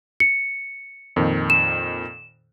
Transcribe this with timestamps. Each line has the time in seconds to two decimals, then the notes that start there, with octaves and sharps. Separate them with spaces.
0.20 C#7
1.16 F2 A#2 D#3
1.50 E7